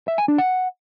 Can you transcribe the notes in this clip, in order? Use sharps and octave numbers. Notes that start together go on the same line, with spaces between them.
E5
G#5
D4
F#5